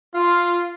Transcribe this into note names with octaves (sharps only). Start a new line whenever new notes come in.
F4